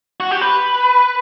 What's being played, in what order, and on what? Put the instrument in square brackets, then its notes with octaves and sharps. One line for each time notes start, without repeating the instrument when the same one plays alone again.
[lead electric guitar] F#4
G4
B4